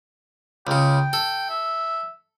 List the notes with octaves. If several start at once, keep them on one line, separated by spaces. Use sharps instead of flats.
C#2 C#3 G5
A4
E5